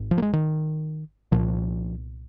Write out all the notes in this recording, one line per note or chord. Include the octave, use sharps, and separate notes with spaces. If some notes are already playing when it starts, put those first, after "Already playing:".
Already playing: G#1 G#2
F3
A#3
G#3
D#3
C2 A#2 F3